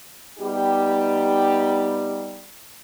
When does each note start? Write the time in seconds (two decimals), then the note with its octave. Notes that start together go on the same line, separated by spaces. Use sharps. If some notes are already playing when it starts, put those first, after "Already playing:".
0.39 G3 B3 D#4 G4